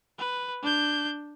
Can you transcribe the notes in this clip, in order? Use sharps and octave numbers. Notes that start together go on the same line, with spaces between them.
B4
D4 G6